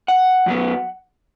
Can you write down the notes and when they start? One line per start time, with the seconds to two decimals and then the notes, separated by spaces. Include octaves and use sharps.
0.08 F#5
0.46 F#2 F#3 B3